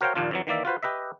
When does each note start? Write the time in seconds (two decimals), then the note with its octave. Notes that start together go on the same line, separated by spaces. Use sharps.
0.01 F#4 A#4 C5 C#5 F5 G5
0.15 A#1 D#2 A#2 D4 F4
0.31 F2 E3 F#3
0.47 D#3 E3 A#3 D5 E5
0.65 F4 F#4 B4 C5
0.83 G4 B4 D#5 E5